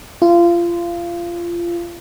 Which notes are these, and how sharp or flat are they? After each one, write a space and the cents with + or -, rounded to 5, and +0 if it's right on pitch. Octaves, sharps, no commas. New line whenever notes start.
F4 -25